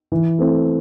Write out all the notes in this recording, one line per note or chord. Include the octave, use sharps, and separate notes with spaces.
E3
A3 C4 E4